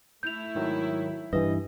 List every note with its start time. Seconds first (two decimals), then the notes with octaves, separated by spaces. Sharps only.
0.23 A3 E4 G6 F7
0.55 G#2 D#3 F#3
1.33 G2 E3 B4 D#5 E5